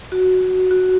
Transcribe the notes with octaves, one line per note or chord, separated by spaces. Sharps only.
F#4
F#4